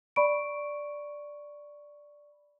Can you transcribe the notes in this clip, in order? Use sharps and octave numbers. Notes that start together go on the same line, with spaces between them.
D5 B5 C#6 D7